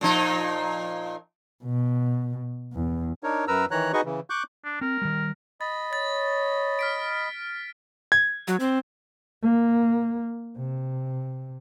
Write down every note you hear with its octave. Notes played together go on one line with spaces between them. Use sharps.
A#2 F3 D#4
B2
E2
D4 D#4 A#4 C#5
F#2 A#4 B4 A#5 E6
D#3 E3 C#5 A#5 F#6
D#4 F#4 G#4 B4 D#5 C#6
C#3 E3
C#6 D6 F#6 G6
D4
C4 A#4
D#3 G3
D#5 B5 A6
C#5 A6
F6 B6 D7
G#6
F#3
C4
A#3
C3